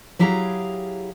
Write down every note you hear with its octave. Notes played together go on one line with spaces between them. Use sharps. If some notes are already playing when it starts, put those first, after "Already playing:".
F#3 E4 G4 G#4 F5 A#5